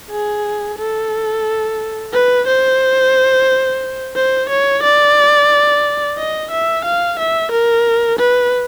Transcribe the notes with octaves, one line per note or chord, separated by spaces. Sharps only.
G#4
A4
B4
C5
C5
C#5
D5
D#5
E5
F5
E5
A#4
B4